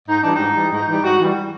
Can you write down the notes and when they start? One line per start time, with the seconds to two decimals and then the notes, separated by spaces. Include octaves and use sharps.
0.08 G#2 D#4
0.21 E3 G3 D4
0.34 D#4
0.40 G#2
0.55 E3 G3
0.71 G#2 D#4
0.87 E3 G3
1.03 G#2 F#4
1.20 E3 G3